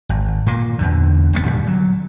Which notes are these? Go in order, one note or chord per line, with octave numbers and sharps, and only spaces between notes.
G#1
A#2 A#3
E2 D3
F#1 D#2 A2 B3
A#2 D3 D#3 G3
F#3